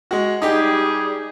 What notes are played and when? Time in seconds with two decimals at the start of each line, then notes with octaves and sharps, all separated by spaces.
0.11 G#3 F#4
0.42 G3 D#4 G4 G#4